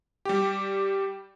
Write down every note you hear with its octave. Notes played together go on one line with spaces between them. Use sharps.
G3 G4